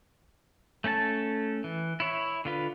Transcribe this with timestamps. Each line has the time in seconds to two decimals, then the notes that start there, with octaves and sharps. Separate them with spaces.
0.84 A3 C#4 A4 A5
1.64 E3
2.00 E4 C#5 E5
2.45 D3 F4 B4